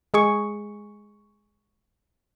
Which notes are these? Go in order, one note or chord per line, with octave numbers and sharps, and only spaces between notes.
G#3 G#4 C#6